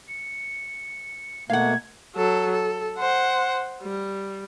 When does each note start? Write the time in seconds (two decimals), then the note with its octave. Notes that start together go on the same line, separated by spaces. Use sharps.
0.08 C#7
1.50 B2 A3 A#3 F5 F#5 G#6
2.16 F#3 A4
2.52 A4
2.98 C5 F#5
3.82 G3